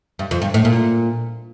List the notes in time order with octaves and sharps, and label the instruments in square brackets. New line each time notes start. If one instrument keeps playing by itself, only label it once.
[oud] G2
F2
G2
A2
A#2